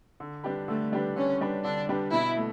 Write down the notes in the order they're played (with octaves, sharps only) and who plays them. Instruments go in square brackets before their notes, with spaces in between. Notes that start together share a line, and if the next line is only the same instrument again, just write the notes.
[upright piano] D3
G3 D4 G4 B4
[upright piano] D3 [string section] A3
[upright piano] G3 D4 G4 B4
[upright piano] D3 [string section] C#4
[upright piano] G3 D4 G4 B4
[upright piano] D3 [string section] D4
[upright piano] G3 D4 G4 B4
[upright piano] B2 [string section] E4
[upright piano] A3